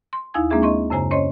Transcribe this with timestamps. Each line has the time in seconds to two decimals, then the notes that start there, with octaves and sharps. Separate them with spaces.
0.13 C6
0.34 D#2 D#4 E4 F5 G#5 G#6
0.50 G#3 A#3 C4 D4 G#4 E5
0.62 D#5 C6 C#6
0.90 F#2 C#3 C5 G#5 A#5
1.11 C#4 C5 C#5 D#5 C6